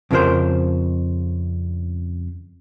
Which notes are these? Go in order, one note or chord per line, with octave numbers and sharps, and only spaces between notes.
F2 C#3 F3 D4 A#4 C5